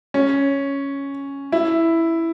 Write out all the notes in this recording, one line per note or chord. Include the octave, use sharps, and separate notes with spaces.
C#4
E4